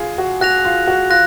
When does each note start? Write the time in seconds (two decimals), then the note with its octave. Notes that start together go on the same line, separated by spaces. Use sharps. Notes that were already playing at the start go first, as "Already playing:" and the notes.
Already playing: F4 G#4
0.18 F#4
0.41 F#4 F#6 A#6 F7
0.65 F4
0.87 F#4
1.10 F4 F#6 A#6